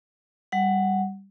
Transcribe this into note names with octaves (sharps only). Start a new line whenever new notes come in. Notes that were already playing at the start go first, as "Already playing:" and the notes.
G3 F#5